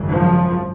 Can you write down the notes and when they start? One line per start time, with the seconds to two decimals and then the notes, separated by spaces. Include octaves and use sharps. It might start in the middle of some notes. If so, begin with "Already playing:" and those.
Already playing: G#1 F#2 C#3
0.10 F3